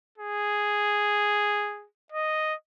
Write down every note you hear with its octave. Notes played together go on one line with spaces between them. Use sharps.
G#4
D#5